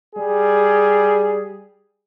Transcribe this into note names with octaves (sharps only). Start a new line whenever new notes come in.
G3 G#4